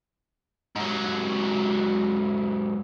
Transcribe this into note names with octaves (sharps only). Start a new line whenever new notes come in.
G#2 F#3